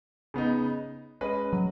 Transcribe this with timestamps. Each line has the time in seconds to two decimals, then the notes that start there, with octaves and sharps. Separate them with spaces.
0.34 C#3 B3 D#4
1.21 G#3 C#4 B4 D#5
1.53 F#3